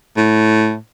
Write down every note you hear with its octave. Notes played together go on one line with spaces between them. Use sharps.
A2